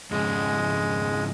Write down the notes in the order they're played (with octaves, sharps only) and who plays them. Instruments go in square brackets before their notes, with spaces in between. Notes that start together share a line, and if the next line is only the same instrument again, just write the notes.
[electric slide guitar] F2 G#2 C#3 [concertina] G#3